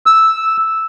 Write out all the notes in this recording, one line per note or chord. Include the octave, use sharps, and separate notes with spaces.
E6